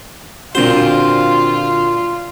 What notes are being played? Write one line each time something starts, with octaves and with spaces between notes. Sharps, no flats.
A#2 D3 C4 F4 F#4 C5